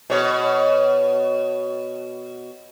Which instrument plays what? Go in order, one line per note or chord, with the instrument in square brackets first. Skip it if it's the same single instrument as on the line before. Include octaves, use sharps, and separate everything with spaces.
[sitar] B2 C#5